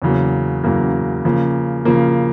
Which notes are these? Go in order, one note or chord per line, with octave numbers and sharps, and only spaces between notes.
E2 C#3 F#3 A#3
E2 C#3 F#3 A#3
C#3 F3 A#3
C#3 F3 A#3